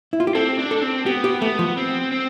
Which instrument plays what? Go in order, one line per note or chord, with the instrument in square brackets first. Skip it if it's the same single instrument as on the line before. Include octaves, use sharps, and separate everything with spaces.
[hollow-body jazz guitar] E4
F4
G4
[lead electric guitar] C4 [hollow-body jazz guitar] A4
[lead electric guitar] D4
[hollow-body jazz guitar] A4
[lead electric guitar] D4
C4
[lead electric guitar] B3 [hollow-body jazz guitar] G4
[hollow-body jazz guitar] G4
[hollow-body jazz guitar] A3 [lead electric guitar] B3
[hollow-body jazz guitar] F3
[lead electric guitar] C4
C4